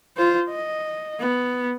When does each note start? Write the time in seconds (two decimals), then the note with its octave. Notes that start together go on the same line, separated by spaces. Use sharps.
0.17 F4 C5
0.50 D#5
1.19 B3